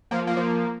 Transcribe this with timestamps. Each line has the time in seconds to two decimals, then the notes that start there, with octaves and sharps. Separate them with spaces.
0.11 F3 A#3
0.27 A#3
0.37 F3